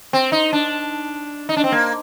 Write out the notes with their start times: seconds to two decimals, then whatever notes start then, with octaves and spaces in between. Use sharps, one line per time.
0.13 C4
0.32 D#4
0.53 D4
1.49 D#4
1.57 D4
1.64 C4
1.72 A#3